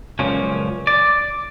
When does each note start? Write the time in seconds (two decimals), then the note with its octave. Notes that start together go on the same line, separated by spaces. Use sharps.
0.19 C#2 F#2 A#2 F3 C#4
0.87 D5